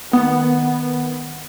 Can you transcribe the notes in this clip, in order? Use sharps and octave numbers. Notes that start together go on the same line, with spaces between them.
D#3 B3